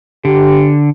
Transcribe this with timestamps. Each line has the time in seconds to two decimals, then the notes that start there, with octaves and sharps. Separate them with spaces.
0.25 D3 G4